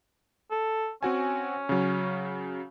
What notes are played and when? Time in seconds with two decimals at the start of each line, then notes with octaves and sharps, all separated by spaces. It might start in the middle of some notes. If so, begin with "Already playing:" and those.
0.51 A4
1.03 C4 C#4 F#4 G#5
1.69 C#3 F#3